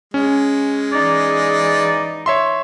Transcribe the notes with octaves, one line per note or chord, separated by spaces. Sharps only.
G#3 C#4
E3 D#4 D5
C#5 E5 C6